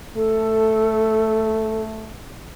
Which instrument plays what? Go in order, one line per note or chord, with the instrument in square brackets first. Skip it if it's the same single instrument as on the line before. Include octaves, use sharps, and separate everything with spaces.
[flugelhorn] A3 [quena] A4